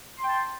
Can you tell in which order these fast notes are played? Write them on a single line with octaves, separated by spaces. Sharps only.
C6 G5 A5